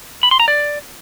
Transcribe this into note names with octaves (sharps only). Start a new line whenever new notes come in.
B5
C6
A#5
D5